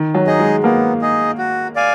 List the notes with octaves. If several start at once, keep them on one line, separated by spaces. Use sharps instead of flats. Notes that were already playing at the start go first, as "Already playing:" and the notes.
Already playing: D#3
F#3
D#4 G#4 D#5
G#3
A#3 B3
D#4 G#4 D#5
F#4
D5 F5 G#5